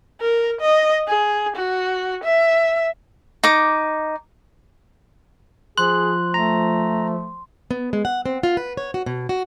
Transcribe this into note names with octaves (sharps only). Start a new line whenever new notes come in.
A#4
D#5
G#4
F#4
E5
D#4 D6
F3 G#4 C6 F#6
A3 A#5
B3
G#3
F#5
C4
F4
B4
C#5
F#4
B2
F#4